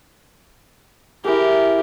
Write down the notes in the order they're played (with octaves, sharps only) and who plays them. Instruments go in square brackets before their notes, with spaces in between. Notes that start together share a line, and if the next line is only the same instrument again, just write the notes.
[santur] E4 G#4 [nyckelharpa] G4 A#4